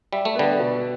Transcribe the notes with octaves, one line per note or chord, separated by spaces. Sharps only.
G3 E5
A3
D3 G3 B3
B2